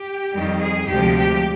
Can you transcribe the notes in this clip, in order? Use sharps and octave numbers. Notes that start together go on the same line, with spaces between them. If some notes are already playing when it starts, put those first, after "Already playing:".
Already playing: G4
F2 D#3 G3
G#4
D2 C3 F3 G#3 G4
G4